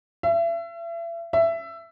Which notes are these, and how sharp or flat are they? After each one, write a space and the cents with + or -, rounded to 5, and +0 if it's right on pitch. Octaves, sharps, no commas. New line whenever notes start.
E5 +35
E5 +15